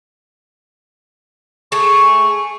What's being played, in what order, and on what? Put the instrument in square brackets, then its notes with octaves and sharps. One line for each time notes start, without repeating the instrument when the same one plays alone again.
[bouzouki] A3 G#4 [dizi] C#6